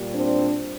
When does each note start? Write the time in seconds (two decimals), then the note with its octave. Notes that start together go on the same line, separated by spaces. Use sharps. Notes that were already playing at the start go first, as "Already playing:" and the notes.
Already playing: A#2 G3
0.14 C4 D4